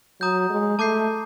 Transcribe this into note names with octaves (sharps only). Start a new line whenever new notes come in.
F#3 A#5 D#6 G6
G#3
A3 A5 D6 G6 C7